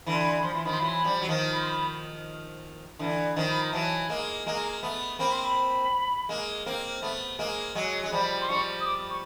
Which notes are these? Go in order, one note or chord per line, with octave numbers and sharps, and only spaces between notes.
D3 E3 B5
C6
B5
C6
B5
F3 C6
B5
E3 C6
D#3 F3 B5
C6
E3 F#3 B5
C6
B5
F3 G3
F#3
D#3 F3
B5
C6
B5
D3 E3
D#3 F3
B5
A#5
E3 F#3 A5
G#3 A#3
G#3 A#3 A#5
A3 B3
A#3 C4 B5
C6
B5
G#3 A#3
A#3 C4
A3 B3
G#3 A#3
F#3 G#3
G#3
F3 G3 B5
C6
F3 G3 C#6
D#6
D6
C#6